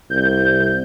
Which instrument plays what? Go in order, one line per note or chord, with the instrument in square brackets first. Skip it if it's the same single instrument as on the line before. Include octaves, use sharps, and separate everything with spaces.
[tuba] C2 [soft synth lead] G6